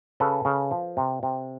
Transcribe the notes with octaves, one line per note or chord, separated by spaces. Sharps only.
C#3 A4 B4
C#3
F3
C3
C3